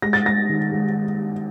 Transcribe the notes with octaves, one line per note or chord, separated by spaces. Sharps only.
G#3 A#6
A6
G#3 A#6
D#3
G#3